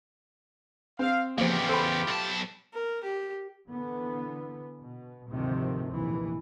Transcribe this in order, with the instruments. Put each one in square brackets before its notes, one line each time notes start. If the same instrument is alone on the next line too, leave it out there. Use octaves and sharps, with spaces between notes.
[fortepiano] C4 [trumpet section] F5
[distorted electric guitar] E2 C#3 [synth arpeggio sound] F3 A#3 [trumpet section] A3 F4 G4
[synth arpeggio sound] A4 [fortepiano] C5 B5
[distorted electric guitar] B1 A5
[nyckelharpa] A#4
G4
[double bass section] D3 E3 B3
B2
D2 G#2 C3 D#3 F3 A3
F1 A#1 D#2 E3